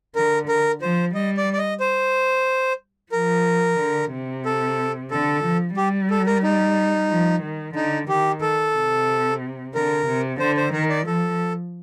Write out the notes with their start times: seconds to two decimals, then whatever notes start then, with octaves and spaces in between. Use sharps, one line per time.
0.16 D3 A#4
0.48 A#4
0.81 F3 C5
1.14 G3 D#5
1.37 D5
1.53 D5
1.58 D#5
1.80 C5
3.12 F3 A#4
3.79 D3
4.12 C3
4.45 A4
5.11 D3 A4
5.44 F3
5.77 G3 G4
6.11 A4
6.26 A#4
6.43 D#4
7.10 F3
7.42 D#3
7.75 D3 D#4
8.08 D#3 G4
8.41 A4
8.75 C3
9.74 D3 A#4
10.07 C3
10.40 D3 C5
10.57 C5
10.73 D#3 A#4
10.90 D5
11.07 F3 A4